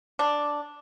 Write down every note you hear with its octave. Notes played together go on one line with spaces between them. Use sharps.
D4